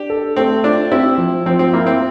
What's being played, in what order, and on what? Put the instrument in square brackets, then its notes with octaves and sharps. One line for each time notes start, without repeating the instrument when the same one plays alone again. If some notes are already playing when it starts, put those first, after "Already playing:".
Already playing: [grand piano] D4 [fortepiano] G4
[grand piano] A4
[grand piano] A3 [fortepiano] C4
[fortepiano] D4 [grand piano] F4
[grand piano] C4 [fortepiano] E4
[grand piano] F3
[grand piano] F3 [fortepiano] C4
[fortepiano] C4
[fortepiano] A#3 [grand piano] E4
[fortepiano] C4